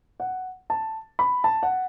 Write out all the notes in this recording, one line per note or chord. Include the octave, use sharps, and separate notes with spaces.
F#5
A5
B5
A5
F#5